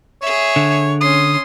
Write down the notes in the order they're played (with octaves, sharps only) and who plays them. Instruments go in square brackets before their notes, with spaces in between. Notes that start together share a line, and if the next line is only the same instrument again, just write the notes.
[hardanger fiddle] G#4 E5 [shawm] C#5
[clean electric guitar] D3
[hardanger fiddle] C#4 C6 [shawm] D#6